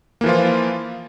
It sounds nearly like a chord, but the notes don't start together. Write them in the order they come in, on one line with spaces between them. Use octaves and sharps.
A#3 E3 F3 F4